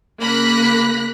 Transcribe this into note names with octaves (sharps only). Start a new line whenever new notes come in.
C#3 A#3 B5 F#6 A#6 B6